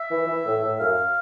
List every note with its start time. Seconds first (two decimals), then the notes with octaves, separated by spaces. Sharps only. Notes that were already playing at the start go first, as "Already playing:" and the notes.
Already playing: E5
0.10 E3
0.27 E3
0.45 A2
0.62 A2
0.80 F#2 F5